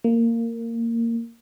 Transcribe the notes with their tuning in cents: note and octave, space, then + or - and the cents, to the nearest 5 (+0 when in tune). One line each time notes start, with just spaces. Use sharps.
A#3 -15